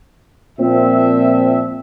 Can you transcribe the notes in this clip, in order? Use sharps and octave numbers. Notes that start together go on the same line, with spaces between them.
A#2 F3 C4 E5